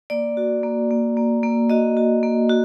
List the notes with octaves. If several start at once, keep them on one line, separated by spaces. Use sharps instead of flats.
A#3 D5
F#4
A#3
A#3
A#3
A#3
F#4 D#5
F#4
A#3
F#4